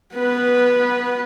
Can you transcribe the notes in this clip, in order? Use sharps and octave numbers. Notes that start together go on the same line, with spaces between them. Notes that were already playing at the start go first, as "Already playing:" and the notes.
B3 B4